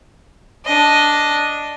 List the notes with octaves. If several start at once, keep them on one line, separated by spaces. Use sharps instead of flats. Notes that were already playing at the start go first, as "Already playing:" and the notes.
D4 D#5